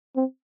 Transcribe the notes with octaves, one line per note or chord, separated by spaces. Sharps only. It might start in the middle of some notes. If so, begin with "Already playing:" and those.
C4